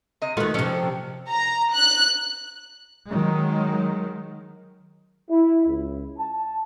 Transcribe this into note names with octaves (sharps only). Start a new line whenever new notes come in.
C3 D#5
D#3 A3 F4 F#4 B4
C3 F3 C#4 A4 D5
A#5
F#6
D#3 F#3 G#3
E4
C#2
A5